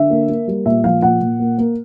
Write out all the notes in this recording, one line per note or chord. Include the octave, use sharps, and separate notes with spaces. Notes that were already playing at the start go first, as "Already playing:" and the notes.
Already playing: D3 E5
A#3
A#3
G3
A#2 E5
F3 F5
A#2 F#5
A#2
A#3
A#3